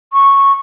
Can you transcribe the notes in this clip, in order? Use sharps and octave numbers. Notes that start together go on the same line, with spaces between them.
C#6